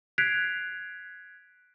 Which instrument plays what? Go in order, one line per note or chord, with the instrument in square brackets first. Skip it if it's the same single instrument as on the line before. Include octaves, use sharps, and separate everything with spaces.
[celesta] F#6 G#6 B6 C7 D7 F7